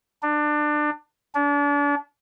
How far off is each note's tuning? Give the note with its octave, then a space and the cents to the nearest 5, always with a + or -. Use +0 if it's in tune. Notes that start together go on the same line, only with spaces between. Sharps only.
D4 +25
D4 -35